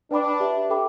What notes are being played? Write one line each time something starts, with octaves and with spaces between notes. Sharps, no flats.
D4 B4 G5 B5 D6
G4 B4 E5
A4 G5 B5 D6